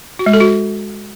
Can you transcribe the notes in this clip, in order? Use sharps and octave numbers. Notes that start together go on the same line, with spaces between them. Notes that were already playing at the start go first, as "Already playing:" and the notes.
F#4
G#3
A4
F#4